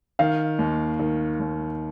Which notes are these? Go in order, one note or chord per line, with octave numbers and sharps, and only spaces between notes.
D#3 F5
D#2
D#3
D#2